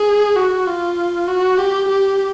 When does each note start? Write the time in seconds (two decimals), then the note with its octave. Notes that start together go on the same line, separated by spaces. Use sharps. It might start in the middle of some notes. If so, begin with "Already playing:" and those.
Already playing: G#4
0.36 F#4
0.67 F4
1.28 F#4
1.58 G4
1.89 G4